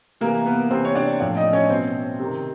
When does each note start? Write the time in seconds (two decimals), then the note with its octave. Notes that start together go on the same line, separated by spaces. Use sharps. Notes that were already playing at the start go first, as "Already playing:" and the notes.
0.21 C3 E3 A#3 A#4
0.46 B3 B4
0.70 C3 E3 C4 C5
0.85 C#5
0.95 D4 D5
1.20 A2 F3 D4 D5
1.37 D#4 D#5
1.53 C#4 C#5
1.70 B2 C4 C5
2.19 C3 D#3